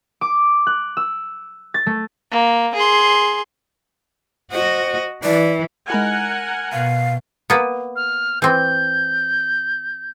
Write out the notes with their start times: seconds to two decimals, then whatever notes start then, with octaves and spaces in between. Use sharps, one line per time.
0.21 D6
0.67 F#6
0.97 E6
1.74 A6
1.86 A3
2.32 A#3
2.75 G#4 C6
4.52 F#4 C5 D#5
5.24 E3 D5
5.90 G#3 D#4 E4 A#4 F#5 G#5
6.72 B2 F5
7.50 A#3 B3
7.96 F6
8.42 E3 C4 G6